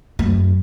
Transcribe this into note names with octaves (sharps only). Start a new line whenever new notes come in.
F#2